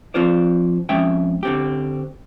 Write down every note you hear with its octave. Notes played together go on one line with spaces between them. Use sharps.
F3 C4 F4 C5 D5
F2 G#3 C#4 E5 G5
D3 C4 G4